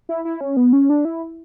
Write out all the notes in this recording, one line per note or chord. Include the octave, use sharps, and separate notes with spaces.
E4
E4
C#4
B3
C#4
D4
E4